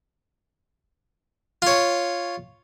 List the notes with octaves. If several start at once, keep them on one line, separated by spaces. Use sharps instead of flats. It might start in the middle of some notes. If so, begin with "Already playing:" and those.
F4 C#5